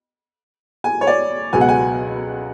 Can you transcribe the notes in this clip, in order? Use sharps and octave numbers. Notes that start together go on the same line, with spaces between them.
G#5
C#5
D5
C#2 B2 F#3 B3 G#5
F#5
G#5